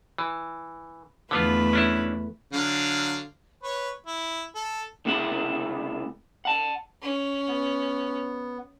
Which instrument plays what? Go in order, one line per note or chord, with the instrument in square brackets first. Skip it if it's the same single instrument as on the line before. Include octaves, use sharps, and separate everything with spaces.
[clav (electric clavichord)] E3
[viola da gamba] E2 A3 B4 [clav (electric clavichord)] D3 B3 F4
[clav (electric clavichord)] C#4 D4 E4
[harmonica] D3 F#3 F5
B4 C#5
E4
A4
[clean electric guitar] C#2 C3 G#3 E4 G4 F#5
F#5 A5
[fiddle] C#4
[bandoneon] B3